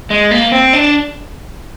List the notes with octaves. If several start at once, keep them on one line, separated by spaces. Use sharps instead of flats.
G#3
A#3
C4
D4